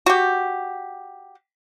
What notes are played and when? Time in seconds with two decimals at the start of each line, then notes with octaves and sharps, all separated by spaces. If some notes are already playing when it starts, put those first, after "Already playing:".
0.06 F#4 G4